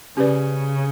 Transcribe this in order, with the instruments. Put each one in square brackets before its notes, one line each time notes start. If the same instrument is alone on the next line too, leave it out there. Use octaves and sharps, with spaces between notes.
[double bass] C#3 [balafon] C#4 G4 B4 D5